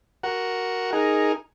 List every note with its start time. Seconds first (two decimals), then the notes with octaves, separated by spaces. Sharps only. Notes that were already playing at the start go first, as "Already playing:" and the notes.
0.23 F#4 A#4 F#5
0.93 D#4 G#4 A#4